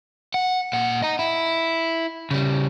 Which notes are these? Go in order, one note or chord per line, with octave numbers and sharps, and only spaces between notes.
F#5
A#2 F#5
D#5 A#5
E4
C#3 G3